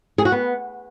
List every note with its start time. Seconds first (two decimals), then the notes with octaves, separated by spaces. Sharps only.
0.18 G#4
0.25 F#4
0.32 B3